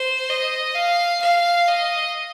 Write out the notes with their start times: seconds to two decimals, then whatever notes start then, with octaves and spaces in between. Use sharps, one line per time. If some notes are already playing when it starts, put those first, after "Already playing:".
Already playing: C5
0.29 D#5
0.75 F5
1.22 F5
1.68 D#5